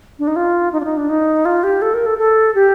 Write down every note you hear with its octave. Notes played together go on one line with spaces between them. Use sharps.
D4
D#4
F4
D#4
D4
D#4
D4
D#4
F4
G4
A4
A#4
A4
A4
G4